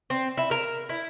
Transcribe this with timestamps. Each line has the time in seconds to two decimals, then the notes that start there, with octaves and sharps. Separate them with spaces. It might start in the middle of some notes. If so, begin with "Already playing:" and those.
0.10 C4
0.37 E4
0.51 A#4
0.89 E4